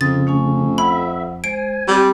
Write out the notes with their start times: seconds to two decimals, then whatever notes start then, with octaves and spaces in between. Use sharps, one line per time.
0.01 F2 C#3 D#6 A6
0.27 A3 C#4 G#5
0.78 E5 F#5 B5
1.44 G#3 C5 G#5 D7
1.88 G3 C4